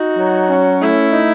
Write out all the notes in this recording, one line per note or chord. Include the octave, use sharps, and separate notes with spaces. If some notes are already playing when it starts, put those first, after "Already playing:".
Already playing: D#4 F#4
F#3
C#4
A3 E4
D#4